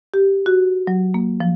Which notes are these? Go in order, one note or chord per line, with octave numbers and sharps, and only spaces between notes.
G4
F#4
F#3
A#3
F3